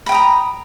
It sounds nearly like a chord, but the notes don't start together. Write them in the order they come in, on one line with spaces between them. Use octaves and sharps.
B5 G5 D#6 A#5